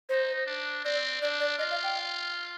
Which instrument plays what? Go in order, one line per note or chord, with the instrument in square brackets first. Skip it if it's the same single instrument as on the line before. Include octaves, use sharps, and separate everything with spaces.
[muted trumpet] D#4 [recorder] C5
[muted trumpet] D4
[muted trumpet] C4 [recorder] D5
[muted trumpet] D4 [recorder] D5
[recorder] D5
[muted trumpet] F4 [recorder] D#5
[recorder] F5
G5